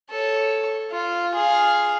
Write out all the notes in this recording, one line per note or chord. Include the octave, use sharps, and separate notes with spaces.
A4 C#5
F4
G#4 F5